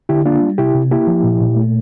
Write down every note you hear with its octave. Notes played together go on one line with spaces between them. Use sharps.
D3 E4 G4
A#3 D4 F4
G3
C3 E4 G4
C3
A#3 E4 G4
F3
A#2
A#2
A3